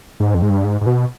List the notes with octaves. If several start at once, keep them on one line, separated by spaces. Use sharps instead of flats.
G#2
F2
G#2
G2
G#2
G#2
B2